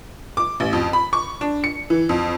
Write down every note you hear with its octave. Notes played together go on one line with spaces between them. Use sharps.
D6
A1
F2
B5
C#6
D4
C#7
E3
F2